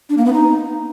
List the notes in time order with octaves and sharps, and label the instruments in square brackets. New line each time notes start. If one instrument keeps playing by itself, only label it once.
[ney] D4
A#3
B3
D#4